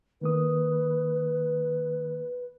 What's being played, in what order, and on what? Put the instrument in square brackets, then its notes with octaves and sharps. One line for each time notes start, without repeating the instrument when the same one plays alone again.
[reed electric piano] D#3 A#3 D#6 [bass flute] B4